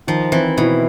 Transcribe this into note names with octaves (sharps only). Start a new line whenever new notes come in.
D#3 F3
E3 C4
B2 E4